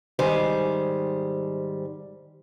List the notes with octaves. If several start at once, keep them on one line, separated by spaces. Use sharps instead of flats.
G#2 D#3 G3 C5 G#5